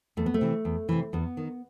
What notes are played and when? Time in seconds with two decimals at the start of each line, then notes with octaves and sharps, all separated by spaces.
0.17 E2 A3
0.26 B3
0.34 A3
0.41 C3 E3
0.65 E2
0.89 C3 E3
1.13 E2 B3
1.37 D#3